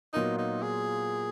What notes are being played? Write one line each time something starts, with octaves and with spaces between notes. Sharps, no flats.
A#2 F#3 B3 D#4 F4 A#4
D#4
G#4